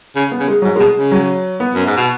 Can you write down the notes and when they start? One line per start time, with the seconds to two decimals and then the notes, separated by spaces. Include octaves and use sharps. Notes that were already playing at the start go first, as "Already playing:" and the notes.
0.16 C#3
0.32 B3
0.40 C#3
0.48 G#3
0.62 G#2 F#3
0.76 B2 G#3
0.97 C#3
1.12 F#3
1.60 B3
1.75 F#2
1.86 G#2
1.97 B2